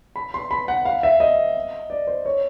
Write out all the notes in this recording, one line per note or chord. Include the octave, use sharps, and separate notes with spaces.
B5
C6
B5
F#5
F5
E5
D#5
D5
C5
C#5